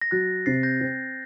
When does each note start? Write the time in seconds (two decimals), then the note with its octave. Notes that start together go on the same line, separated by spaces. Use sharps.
0.01 A#6
0.11 F#3 F#6 A6
0.46 C3 A6 C7
0.63 G6 A#6
0.81 C4